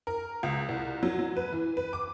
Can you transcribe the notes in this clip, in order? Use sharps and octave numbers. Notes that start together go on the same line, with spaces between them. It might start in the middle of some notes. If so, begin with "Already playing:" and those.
A#4
C#2
C2
F#3
F#3
B4
E3
B4
D6